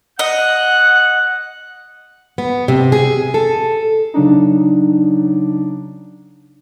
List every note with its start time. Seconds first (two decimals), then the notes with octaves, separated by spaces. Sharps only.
0.19 D#5 F#5 F#6
2.38 B3
2.68 C3
2.92 G#4
3.34 A4
4.14 C#3 F#3 D4 D#4